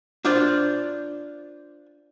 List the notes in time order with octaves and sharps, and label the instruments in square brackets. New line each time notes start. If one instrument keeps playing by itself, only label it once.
[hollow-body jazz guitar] D4 F4 C5 D5